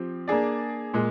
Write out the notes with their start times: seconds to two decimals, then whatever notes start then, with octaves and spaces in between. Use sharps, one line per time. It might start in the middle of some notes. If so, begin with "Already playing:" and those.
Already playing: F3 C4 G4
0.28 A#3 D4 G#4 D5
0.94 A#2 G#3